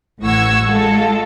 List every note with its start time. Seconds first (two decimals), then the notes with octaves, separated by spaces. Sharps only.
0.21 A1 A2 F#5 C#6 E6 G#6
0.65 G#3 F4 A4